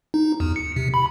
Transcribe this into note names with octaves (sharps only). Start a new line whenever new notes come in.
D#4
E2
C#7
C3
B5